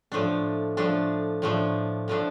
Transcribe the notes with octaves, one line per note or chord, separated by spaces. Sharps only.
A2 F3 A3 D4
A2 F3 A3 D4
A2 F3 A3 D4
A2 F3 A3 D4